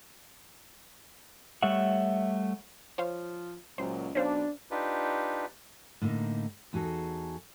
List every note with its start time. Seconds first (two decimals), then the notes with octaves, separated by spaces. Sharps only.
1.62 G3 A3 C#5 E5 F#5
2.98 F3 C5 C#5 F5
3.78 C#2 A#2 F#3 C5
4.15 B1 C#4 D4 C5 F5
4.71 D4 D#4 F4 G4 B4
6.02 A2 D3 A#3 D#4
6.73 E2 D#4 F#4 G#4 A4